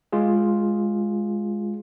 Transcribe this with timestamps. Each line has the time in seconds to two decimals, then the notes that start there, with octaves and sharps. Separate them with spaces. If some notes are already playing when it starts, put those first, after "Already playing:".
0.12 G#3 F4 G#4